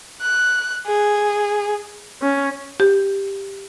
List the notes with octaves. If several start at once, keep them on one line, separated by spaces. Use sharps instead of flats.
F#6
G#4
C#4
G4